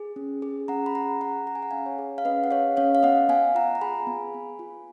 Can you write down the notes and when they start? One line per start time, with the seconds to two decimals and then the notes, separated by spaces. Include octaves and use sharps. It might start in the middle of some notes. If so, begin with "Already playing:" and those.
Already playing: G#4
0.16 C#4
0.42 G#4
0.68 C#4 F#5 A#5
0.86 B5
0.94 G#4 F#5 A#5
1.20 C#4 F#5 A#5
1.47 G#4 A#5
1.55 G#5
1.62 F#5
1.71 C#4 F5 G#5
1.86 C#5
1.98 G#4
2.18 F5
2.25 C#4 B4 D#5
2.44 F#5
2.51 G#4 C#5 F5
2.77 C#4 C#5 F5
2.95 F5
3.03 B3 D#5 F#5
3.29 B3 F5 G#5
3.55 F4 F#5 A#5
3.75 A#5
3.81 G#4 G#5 B5
4.07 B3
4.34 B3
4.59 F4